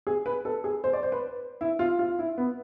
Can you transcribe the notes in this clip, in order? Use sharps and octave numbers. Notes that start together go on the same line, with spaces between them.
G#4
B4
A4
G#4
C5
D5
C5
B4
E4
F4
F4
E4
B3